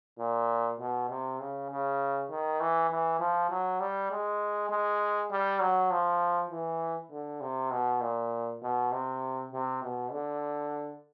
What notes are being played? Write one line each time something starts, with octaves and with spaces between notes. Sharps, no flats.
A#2
B2
C3
C#3
C#3
D#3
E3
E3
F3
F#3
G3
G#3
G#3
G3
F#3
F3
E3
D3
C3
B2
A#2
B2
C3
C3
B2
D3